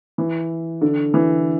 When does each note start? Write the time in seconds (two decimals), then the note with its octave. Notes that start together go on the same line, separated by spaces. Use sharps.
0.18 E3
0.81 D3
1.14 E3